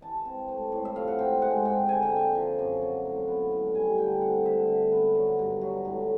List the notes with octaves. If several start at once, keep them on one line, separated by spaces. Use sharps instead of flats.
E3 A5
C4
A3
A2
E5
F3 F5
F#5
C4 G5
G#3 F#5
G#2 G5
D3 G#5
G5
A#3 G#5
F3
F#2
F#3
A2
B3
A2
G3 G#5
D3 G5 G#5
C4 F#5
D3 E5
D3
B3
F#3
G2
F#3
A2